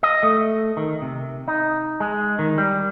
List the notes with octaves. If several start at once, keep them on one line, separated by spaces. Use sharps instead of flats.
D#5
A3
D#3
C3
D#4
G#3
D#3
G3